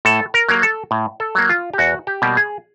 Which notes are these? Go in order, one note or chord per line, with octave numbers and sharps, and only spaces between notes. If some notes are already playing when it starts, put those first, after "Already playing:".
A2 A4
A#4
F#3 A#3
A4
A2
A4
F#3 A#3
F4
G4
E2 F#4
G4
B2 G3 A#3
G#4